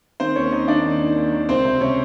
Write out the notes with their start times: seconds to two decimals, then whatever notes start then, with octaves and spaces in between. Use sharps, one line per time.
0.20 D#3 C4 C5
0.35 D#2 C#4 C#5
0.51 D#3 D#4 D#5
0.68 D#3 D4 D5
0.85 D#2
1.01 D#3
1.17 D#2
1.32 D#3
1.49 C#2 C4 C5
1.65 C3
1.81 C3 C#4 C#5